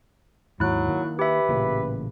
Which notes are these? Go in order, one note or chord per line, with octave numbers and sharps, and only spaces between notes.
D#2 G#2 F#3 E4 F#6
D#3 A#3
G4 B4 E5
A1 A#2 C#3